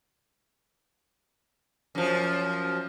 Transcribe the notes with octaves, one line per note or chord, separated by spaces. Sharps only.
F#2 F3